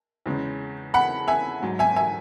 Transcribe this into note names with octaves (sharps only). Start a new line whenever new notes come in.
E2 C#3 G#3
F#5 B5
E5 G#5
G#2 F#3
E5 G#5
E5 G#5